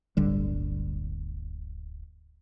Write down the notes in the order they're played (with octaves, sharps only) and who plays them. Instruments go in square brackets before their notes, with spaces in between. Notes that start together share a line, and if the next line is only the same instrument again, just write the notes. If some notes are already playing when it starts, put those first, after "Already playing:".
[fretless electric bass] D1 G1 D3 G3